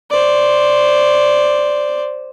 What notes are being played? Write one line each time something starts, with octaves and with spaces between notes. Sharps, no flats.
C5 D5